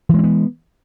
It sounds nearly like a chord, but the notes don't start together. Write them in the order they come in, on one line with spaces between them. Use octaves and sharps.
E3 G#3 C4 B3